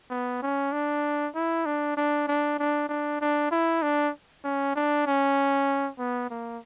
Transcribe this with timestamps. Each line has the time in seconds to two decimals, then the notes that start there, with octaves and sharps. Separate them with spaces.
0.10 B3
0.43 C#4
0.73 D4
1.35 E4
1.66 D4
1.97 D4
2.28 D4
2.59 D4
2.89 D4
3.21 D4
3.51 E4
3.82 D4
4.44 C#4
4.76 D4
5.07 C#4
5.98 B3
6.30 A#3